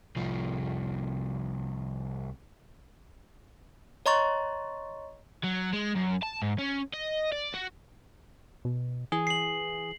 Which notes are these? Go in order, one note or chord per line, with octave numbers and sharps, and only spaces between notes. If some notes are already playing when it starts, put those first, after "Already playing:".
C2 F3
C#5 D#5 A#5 C6 C#6 A6
F#3
G#3
F#2
A5
G#2
C#4
D#5
D5
F#4
B2
E3 G#4
C7 F#7